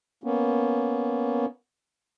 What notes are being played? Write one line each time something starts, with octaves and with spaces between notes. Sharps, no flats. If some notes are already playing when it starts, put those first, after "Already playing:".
A#3 B3 C#4